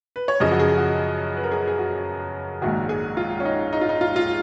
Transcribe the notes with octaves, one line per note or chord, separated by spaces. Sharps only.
B4
C#5
F#2 C#3 F3 D#5
F#4
G#4
F#4
B4
A#4
G#4
G#4
F#4
A#1 G#2 D#3 F#4
G#4
F4
C#4
D#4
D#4
F4
D#4
F4
F4